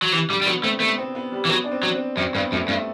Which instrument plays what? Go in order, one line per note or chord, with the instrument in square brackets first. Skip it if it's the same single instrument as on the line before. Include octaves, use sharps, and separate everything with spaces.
[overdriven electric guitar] F#3
[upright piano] C3 [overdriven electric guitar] E3
[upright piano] D3 [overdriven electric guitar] G3
[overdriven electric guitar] G3
[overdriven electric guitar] F#3 [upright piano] B3
[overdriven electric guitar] A3 [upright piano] C4
[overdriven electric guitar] A3 [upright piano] B3
[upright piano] C4
B3
G3
[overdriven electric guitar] E3
[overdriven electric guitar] F#3 [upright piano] B3
[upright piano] D4
C4
[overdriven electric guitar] F#3
[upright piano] C4
[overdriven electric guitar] F#2 [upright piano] C4
[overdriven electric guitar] G2 [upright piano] B3
[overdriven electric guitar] F#2 [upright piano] A3
[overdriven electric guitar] G2 [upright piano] A3